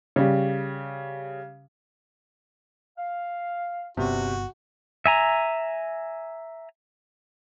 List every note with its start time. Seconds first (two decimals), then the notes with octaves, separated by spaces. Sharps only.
0.16 C#3 G3
2.97 F5
3.97 G1 C2 C3 B3 C#4 F#4
5.06 E5 G#5 A#5